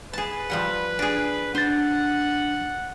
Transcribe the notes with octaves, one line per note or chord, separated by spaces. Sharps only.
G#4 B4 A5
F3 G3 F#5
D4 G#4
D4 C5 F#5 A6